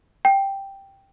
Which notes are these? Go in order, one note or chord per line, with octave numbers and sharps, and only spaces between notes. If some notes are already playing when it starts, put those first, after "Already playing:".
G5